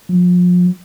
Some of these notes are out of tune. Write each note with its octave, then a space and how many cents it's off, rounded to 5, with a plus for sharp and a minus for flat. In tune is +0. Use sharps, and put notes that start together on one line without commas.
F3 +35